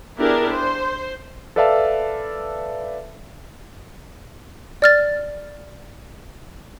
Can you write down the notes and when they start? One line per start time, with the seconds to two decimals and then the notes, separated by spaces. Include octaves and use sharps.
0.18 B3 D4 E4 G4 G#4 A#4
0.54 C5
1.56 A4 B4 D5 E5 F5 A5
4.82 D5 F6 A6